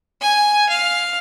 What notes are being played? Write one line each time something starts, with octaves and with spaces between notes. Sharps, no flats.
G#5
F5